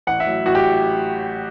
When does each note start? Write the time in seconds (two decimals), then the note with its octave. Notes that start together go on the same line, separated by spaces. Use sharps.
0.07 A1 F#5
0.20 E5
0.26 A2 F#3
0.46 A1 F#4
0.55 G4